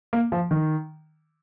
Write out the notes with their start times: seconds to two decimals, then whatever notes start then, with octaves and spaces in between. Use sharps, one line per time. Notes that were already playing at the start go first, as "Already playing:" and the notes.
0.13 A#3
0.32 F3
0.51 D#3